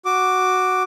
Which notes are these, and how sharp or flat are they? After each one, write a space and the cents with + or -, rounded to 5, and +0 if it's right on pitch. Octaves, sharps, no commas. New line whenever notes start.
F#4 +0 D6 +0